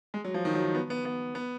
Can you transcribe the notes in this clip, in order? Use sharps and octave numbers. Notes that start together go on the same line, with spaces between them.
G#3
F#3
F3
D#3
F#3
D#3
B3
B3
B3
B3